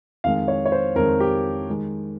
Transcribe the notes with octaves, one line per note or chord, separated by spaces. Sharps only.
F2 D#3 G#3 F5
C#5
C#5
C5
F2 D#3 G#3 A#4
G4
D#3 G#3